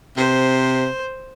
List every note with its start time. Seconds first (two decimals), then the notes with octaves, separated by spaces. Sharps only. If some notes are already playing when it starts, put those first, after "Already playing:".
0.17 C3 C5